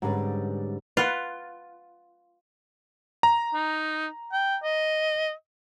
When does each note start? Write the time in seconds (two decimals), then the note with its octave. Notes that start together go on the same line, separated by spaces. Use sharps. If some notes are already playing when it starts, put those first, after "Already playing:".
0.02 G#2 D3 G3 G#3 C#4 B4
0.97 F4 B4 F#5
3.23 A#5
3.54 D#4
4.32 G5
4.63 D#5